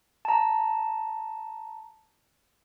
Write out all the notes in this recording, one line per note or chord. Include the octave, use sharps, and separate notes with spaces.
A5 A#5